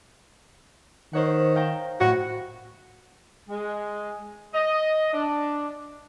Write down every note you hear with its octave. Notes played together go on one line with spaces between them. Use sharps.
D#3 C5 C#5 F#5
F5 G5 A#5
A2 F#4 F#6 A#6
G#3
D#5
D4